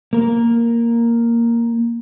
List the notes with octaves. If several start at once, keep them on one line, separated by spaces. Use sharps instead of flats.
A#3 A#4